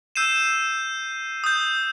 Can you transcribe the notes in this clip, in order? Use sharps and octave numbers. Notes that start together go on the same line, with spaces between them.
E6 G6 C7 D#7 E7
D#6 G6